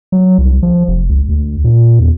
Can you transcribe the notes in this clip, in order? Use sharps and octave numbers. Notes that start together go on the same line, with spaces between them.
F#3
C2
F3
F1
C#2
D2
A#2
E2